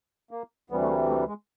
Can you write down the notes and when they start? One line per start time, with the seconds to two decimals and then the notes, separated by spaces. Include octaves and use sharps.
0.31 A#3
0.70 D2 C3 E3 G3 B3
0.82 A3
0.89 A#3
1.09 A3
1.28 G#3